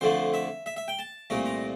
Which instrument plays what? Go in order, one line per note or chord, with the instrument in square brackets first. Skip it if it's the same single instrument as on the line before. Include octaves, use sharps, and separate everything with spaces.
[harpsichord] F2 D3 F3 A3 C5
E5
E5
E5
G5
A5
C2 A#2 A3 A#5
A#5